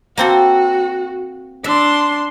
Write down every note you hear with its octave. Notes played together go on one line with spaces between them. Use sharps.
A#3 C4 F#4 A4
D4 E5 C6